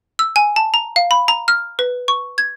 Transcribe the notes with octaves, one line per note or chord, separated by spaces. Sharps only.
E6
G#5
A5
A#5
F5
B5
A#5
F6
B4
C#6
G#6